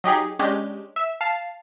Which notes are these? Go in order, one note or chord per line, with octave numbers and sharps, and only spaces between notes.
F#3 D#4 G4 G#4
G#3 C#4 D4 G4
E5
F5 A5